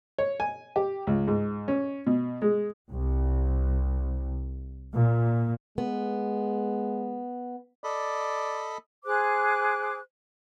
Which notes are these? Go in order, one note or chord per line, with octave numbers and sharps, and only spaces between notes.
C#5
G#5
G4
C#2
G#2
C#4
B2
G#3
C2
A#2
G#3 B3
A4 D5 D#5 B5
G#4 C5 D6 F#6